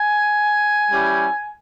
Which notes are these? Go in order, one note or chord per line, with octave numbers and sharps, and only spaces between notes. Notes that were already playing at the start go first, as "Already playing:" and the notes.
Already playing: G#5
G3 C#4 E4 G4